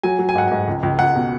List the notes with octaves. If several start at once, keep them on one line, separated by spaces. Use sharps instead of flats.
F#3 G#5
F#3
G#5
G#2 F#5
G#2 G#5
C#2
C#2
C#2 F#5
B2